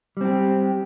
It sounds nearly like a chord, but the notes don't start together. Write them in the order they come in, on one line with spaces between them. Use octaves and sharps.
G3 C4 G4